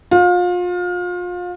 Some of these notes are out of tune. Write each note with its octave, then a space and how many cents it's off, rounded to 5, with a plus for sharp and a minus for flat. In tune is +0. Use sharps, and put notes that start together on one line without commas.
F4 +30